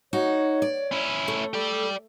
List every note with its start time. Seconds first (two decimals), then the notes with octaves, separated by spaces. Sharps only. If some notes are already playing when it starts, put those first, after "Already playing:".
0.13 D#4 F#4 C#5
0.62 D5
0.92 C#4 E4
1.28 A3
1.53 G4 A4 D5